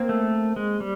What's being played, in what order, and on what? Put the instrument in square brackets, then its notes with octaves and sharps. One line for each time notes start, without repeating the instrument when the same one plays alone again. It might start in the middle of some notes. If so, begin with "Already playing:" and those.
Already playing: [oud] A#3 C4
[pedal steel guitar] A3
G#3
G3